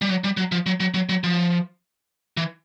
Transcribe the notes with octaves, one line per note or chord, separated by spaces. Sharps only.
G3
F#3
G3
F#3
F3
F#3
F#3
F#3
F#3
F3
E3